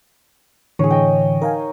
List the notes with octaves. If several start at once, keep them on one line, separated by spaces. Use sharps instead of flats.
A2 D3 E3 G#4 C#5
D#5 G5
D#4 A#4 F5 G#5